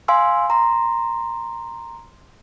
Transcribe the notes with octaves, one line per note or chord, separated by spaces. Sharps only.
F5 G#5 C6 E6
A#5 C6